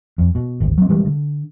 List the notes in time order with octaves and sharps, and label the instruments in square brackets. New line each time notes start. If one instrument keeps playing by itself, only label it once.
[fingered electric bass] F2
B2
G#1 D2
F#3 C4
C3 E3 G3 G#3
D3